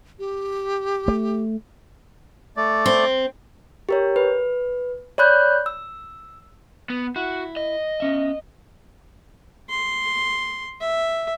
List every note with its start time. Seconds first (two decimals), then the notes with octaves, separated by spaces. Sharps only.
0.19 G4
1.08 A3
2.57 A3 D5
2.86 C4
3.89 G4 A#4 C#5
4.16 B4
5.18 C#5 D5 B5 F#6 G6
5.66 E6
6.90 B3
7.16 E4 F#4
7.56 D#5
8.00 B3 C#4 E5
9.70 C6
10.81 E5